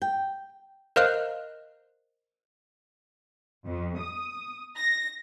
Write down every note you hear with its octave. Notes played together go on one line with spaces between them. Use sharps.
G5
A#4 C5 D#5 F5 F6 F#6
F2
D#6
A#6